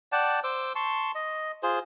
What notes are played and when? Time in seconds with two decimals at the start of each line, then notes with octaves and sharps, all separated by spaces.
0.12 D5 F#5 G5 A5
0.44 C5 D6 E6
0.75 A5 C6 C#6
1.15 D#5
1.63 F4 G#4 C5